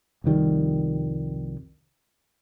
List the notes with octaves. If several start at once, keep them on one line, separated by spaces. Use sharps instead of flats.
C2 F2 D#3 G3